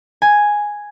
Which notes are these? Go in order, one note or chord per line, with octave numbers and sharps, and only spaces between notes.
G#5